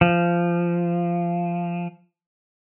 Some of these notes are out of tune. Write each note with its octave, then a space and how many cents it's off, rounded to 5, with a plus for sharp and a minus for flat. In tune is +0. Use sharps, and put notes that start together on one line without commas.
F3 -15